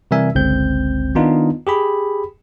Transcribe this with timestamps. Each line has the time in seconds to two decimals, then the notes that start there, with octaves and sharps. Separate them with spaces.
0.11 C3 E3 G3 A#4 E5 G#5
0.35 G1 C#2 C4 G6
1.15 D#3 B3 D4 D#4 F4
1.67 G4 G#4 B5